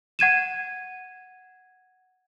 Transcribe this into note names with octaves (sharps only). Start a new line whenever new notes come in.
F#5 G#6 D#7 E7